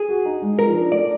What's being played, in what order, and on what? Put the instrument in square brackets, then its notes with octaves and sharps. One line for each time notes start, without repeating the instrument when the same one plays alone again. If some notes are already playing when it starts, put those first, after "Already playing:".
Already playing: [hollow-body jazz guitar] G#4
[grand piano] F#4
D#4
G#3
[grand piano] F3 [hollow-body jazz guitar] A#4
[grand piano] D4
[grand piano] A3 [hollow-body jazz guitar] D5